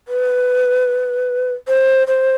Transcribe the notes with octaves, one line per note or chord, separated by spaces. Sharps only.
B4
C5
C5